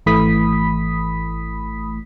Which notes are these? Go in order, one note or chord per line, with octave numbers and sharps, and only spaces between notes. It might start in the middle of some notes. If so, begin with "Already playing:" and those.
G#1 E3 A3 B5 D#6 B6